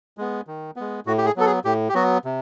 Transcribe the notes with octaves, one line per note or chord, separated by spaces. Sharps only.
G#3 B3
D#3
G#3 B3
A2 F#4
G4
G#4
F#3 B3 A4
G#4
A2 G4
G4
F#3 B3 F#4
C3